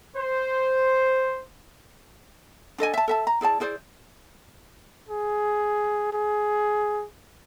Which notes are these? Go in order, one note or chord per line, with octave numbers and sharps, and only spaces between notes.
C5
D4 A4 D#5 G#5
E5 A5
A4 E5 A5
A#5
E4 G#4 D5 A5
E4 G#4 C5 D5
G#4
G#4